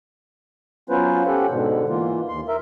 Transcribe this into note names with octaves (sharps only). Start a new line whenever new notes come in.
F#3 B3 C#4 F4 B4 C5
C#4 G4 A4 F#5
G#2 B2 D3
E3 A#3 F4
D#2 C6
A#4 E5